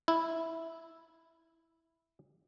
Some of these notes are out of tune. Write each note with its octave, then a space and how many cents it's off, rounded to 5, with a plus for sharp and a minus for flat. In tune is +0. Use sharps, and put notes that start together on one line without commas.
E4 -5